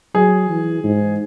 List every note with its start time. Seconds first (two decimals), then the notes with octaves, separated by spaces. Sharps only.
0.15 F#3 G#4
0.49 E3
0.84 G#2